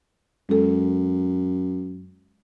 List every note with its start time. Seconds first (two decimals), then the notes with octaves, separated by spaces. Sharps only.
0.49 F#2 G#3 A4